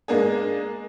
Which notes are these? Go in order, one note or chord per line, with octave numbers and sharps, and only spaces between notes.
G#3 A#3 D4 G#4